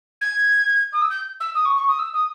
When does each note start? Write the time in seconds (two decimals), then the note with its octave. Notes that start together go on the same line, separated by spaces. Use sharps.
0.21 G#6
0.92 D#6
1.01 E6
1.10 G6
1.40 E6
1.55 D#6
1.65 C#6
1.77 C#6
1.88 D#6
1.99 E6
2.14 D#6